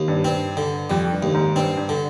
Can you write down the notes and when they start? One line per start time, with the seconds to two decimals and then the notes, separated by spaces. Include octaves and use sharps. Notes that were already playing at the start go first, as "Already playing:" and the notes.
Already playing: D#2
0.08 G2
0.25 G2 C4
0.57 D3
0.90 F2 G3
1.12 G2
1.23 D#2
1.34 G#2
1.56 G2 C4
1.77 G2
1.89 D3